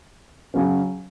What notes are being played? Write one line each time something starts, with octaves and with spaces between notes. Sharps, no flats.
C#3 F#3 C#4